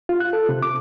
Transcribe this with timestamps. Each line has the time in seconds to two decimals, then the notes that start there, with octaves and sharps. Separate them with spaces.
0.09 F4
0.20 F#6
0.33 A4
0.49 C3
0.63 D6